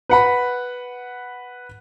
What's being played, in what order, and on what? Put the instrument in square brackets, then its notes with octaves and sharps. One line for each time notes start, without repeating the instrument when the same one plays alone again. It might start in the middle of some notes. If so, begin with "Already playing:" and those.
[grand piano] B4 F#5 B5